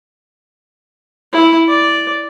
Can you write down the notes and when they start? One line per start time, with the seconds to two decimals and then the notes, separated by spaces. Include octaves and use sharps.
1.33 E4
1.68 D5